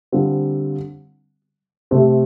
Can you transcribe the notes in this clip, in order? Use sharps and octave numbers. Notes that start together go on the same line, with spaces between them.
D3 G3 C4 F4
C3 A3 C4 G4 C5